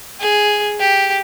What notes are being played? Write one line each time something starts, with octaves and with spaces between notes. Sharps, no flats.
G#4
G4